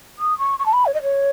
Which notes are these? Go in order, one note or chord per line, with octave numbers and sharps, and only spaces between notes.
D#6
C#6
C#6
A5
B5
C#5
D#5
C#5